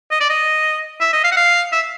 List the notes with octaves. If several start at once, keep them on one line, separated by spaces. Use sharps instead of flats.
D#5
D5
D#5
E5
D#5
F5
F#5
F5
E5